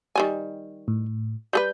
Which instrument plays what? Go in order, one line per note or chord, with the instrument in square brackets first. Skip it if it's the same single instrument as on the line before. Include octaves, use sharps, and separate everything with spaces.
[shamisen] D#3 G3 G#5
[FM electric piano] A2
[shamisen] G3 G#4 B4 [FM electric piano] G6